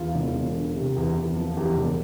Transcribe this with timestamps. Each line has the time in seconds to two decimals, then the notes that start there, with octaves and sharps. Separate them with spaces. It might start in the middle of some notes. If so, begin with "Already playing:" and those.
Already playing: E2 F4
0.15 E1
0.34 E1
0.55 D3
0.76 C3
0.96 E2
1.17 E2
1.36 F3
1.57 E2 G4
1.77 E1